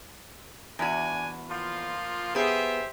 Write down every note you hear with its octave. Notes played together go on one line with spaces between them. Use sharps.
E2 D4 F#4 G#5
F3 A#3 F4
B3 G4 G#4 C5 E5